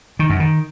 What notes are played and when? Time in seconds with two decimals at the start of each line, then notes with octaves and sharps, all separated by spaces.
0.19 D#3
0.30 F#2
0.40 D#3